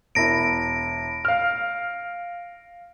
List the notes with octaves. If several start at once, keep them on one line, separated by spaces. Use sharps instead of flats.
E1 E4 A#6 D7
F5 F6